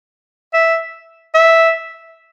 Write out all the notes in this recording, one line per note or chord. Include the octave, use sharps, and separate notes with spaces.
E5
E5